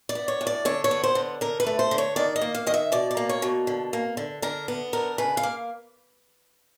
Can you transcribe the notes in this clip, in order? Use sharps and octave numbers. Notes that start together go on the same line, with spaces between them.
D5
B3
C#5
A2
D5
D3 C#5
C#5
B3
C5
D3
D3 A#4
B4
A3
C5
D3
C#5
D#3 D5
D#5
A#3
F5
D#3 D#5
E5
B2 D5
D5
A#3
C#5
B2
D3
A#3
D3
D3 A#4
B3
D3 A#4
C#3 B4
F5
A#3